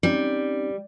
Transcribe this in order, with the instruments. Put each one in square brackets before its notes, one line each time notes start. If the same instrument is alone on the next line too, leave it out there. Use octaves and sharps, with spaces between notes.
[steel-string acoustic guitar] G3 [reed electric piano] C4 C#4 D#4